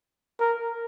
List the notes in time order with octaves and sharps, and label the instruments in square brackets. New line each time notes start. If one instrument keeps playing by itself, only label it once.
[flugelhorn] A#4